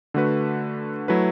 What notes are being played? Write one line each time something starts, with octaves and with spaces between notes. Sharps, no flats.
D3 A3 F#4 B4
F#3 A3 E4 B4